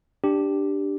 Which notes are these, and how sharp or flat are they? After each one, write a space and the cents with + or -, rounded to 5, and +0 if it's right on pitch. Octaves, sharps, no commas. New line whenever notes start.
D4 +0 G4 +0